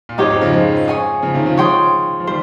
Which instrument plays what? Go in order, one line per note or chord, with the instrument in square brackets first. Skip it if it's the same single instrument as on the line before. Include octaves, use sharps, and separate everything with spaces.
[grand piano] A#2
[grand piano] F2 G#2 [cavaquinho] D#4 G4 C#5
[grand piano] F2 G#2
C#3 F3
F3 G#3
[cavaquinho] C#5 G#5 D#6
[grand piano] C#3 F3
C3 D#3
C#3 F3
[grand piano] F3 G#3 [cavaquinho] C#5 G5 C6 D#6
[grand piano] F3
[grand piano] D#3 G3 [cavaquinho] C5